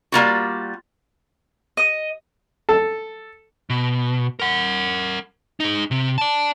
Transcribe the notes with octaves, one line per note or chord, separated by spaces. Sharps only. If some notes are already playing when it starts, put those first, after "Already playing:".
G3 A#3 F4 F#4
D#5
A4
B2
A#4 F#5
D#4 G#4
C3
D5 A5